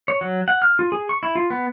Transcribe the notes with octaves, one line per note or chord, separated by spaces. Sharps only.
C#5
F#3
F#5
F6
F4
G#4
C#6
E4
F4
B3